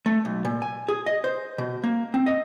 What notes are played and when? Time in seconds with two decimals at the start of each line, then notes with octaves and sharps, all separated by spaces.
0.06 A3
0.25 B1
0.45 A#2
0.62 G#5
0.88 G#4
1.06 D#5
1.24 C5
1.58 B2
1.84 A#3
2.14 C4
2.26 D#5